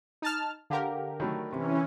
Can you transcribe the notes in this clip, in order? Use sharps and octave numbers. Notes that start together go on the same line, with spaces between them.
D#4 A5 F6
D3 G4 A4 A#4 F5 F#5
D#3 F#3 A3 C#5 B5 C#6
C3 E3 C#4